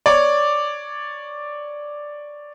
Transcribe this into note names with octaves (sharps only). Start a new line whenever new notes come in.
C#5 D5